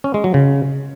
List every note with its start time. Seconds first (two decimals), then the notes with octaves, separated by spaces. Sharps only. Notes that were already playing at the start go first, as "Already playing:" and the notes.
0.04 C#4
0.14 G#3
0.24 F#3
0.34 C#3